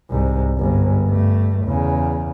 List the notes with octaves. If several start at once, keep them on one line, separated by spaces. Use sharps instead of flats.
C2 G#2
G1 G#2
G2 A3
E2 C#3